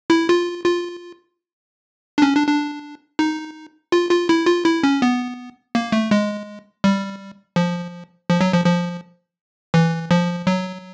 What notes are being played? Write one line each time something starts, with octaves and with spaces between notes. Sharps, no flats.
E4
F4
F4
D4
C#4
D4
D4
D#4
F4
F4
E4
F4
E4
C#4
B3
A#3
A3
G#3
G3
F3
F3
F#3
F3
F3
E3
F3
F#3